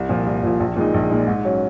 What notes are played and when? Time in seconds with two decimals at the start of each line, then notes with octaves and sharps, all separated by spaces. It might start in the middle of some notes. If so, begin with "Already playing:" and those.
Already playing: C2
0.09 A#2 F3
0.26 C2
0.43 A#2 F3
0.60 A#1
0.76 A#2 G#3 D#4
0.94 A#1
1.10 A#2 G#3 D#4
1.27 G#2
1.45 F#3 C#4